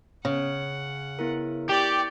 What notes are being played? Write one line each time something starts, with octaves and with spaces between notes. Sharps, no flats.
C#3 F#5
B3 E4 A#4
G4 D5 C#6